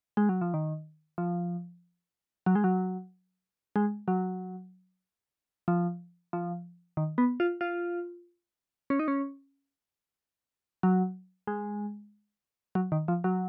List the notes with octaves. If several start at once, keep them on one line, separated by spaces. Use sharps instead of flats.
G#3
F#3
F3
D#3
F3
F#3
G#3
F#3
G#3
F#3
F3
F3
D#3
B3
F4
F4
C#4
D#4
C#4
F#3
G#3
F#3
D#3
F3
F#3